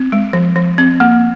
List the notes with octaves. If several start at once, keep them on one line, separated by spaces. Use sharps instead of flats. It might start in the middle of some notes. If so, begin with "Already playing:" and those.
Already playing: C4
G#3
F3
F3
C4
A#3